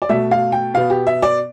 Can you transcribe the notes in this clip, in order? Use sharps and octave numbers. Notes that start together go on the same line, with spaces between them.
D5
B2 A3 E5
F5
G5
B2 B3 F5
G4
E5
D5